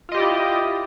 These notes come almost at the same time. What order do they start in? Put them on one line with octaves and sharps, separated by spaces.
F4 D#5 G4 D5 E4